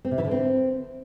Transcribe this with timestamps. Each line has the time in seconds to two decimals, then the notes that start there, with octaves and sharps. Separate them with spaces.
0.05 C4
0.11 C3
0.18 E3
0.24 D3
0.31 C4